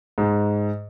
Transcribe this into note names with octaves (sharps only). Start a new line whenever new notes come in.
G#2